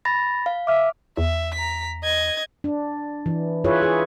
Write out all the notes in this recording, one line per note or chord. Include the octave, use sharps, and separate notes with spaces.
B5 A6 A#6
F5
E5 D6 F6
E2 E5
A#5 B6
D#5 G#6
D4
E3
E4 F4 G#4 B4 C#5
G#4